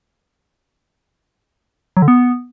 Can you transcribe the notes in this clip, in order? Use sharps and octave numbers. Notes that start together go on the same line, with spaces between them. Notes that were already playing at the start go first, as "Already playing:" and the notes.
F#3
D3
B3